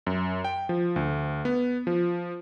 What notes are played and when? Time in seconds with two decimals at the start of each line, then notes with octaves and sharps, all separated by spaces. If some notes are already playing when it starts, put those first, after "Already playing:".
0.07 F#2
0.44 G5
0.69 F3
0.96 D2
1.45 B3
1.87 F3